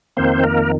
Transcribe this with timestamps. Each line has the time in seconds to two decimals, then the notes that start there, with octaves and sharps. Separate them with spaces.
0.17 F2 D#3 A#3 C4 C5
0.44 A#3 A#4